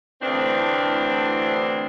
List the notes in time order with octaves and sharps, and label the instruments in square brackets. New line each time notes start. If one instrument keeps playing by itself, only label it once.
[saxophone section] D2 A2 E3 C4 D4